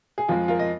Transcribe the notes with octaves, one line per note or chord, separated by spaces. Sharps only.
G#4
F2 F3 G#3 F4
F4 A#4
D#5